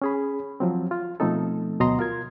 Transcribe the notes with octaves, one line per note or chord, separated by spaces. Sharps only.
C#4 G#4 B5
F3 F#3 C4
F4
B2 F3 A3 C4 D#4 A4
D2 B2 F#3 D#5 A#5 C6
F4 A#4 G#6